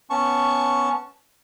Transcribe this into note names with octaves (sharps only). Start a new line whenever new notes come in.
B3 C#4 A5 C#6